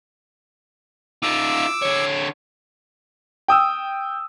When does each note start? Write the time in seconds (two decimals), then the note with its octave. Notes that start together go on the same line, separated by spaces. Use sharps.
1.23 D#4 F4 D6 E6
1.82 D3 C#5
3.48 G5 D#6 E6